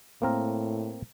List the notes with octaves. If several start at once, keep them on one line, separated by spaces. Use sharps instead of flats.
A2 A#3 C4 A#4